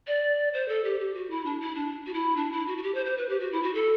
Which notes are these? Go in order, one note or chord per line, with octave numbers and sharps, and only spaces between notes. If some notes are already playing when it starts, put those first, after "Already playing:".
D5
C5
A4
G4
G4
F#4
E4
D4
E4
D4
F#4
E4
D4
E4
F#4
F#4
G4
C5
C5
B4
G4
F#4
E4
F#4
A4